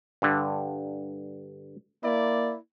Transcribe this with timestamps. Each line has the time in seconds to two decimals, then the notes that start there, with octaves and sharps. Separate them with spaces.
0.22 G2 D3
2.04 A#3 E4 D5